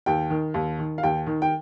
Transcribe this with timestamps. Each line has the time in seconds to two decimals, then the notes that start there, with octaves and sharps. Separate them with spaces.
0.06 D#2 G5
0.30 D#3
0.54 D#2
0.79 D#3
0.98 F5
1.03 D#2 G5
1.27 D#3
1.42 G5